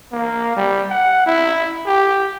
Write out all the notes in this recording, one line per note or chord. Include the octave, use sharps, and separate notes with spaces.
A#3
G3
F#5
E4
G4